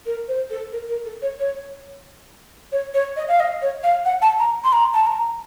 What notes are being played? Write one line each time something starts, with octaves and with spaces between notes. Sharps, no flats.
A#4
C5
A4
A#4
A#4
A4
C#5
C#5
C#5
C#5
D#5
F5
D#5
C#5
F5
F#5
A5
A#5
C6
A#5
A5
A#5